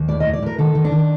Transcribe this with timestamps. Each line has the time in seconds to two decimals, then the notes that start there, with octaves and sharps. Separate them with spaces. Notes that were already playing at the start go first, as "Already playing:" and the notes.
Already playing: D#2
0.08 A2 D5
0.20 A2 D#5
0.33 D5
0.42 A2 A#4
0.58 D#3 A4
0.75 D#3
0.84 D4
0.92 D#3